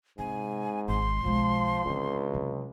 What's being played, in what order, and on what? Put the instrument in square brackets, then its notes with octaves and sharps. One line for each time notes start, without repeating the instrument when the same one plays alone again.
[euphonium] G#2 [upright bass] C3 [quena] G#5
[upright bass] G#1 [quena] C6
[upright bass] B1 G#3 [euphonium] F3
[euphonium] C#2 [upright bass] D3 C4
[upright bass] C3 F#3